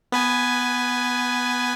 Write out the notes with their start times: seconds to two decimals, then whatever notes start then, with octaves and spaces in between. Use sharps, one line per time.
0.12 B3 B4 G#5